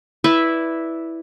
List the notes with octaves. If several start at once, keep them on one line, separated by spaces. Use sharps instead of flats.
E4 B4 D5 E5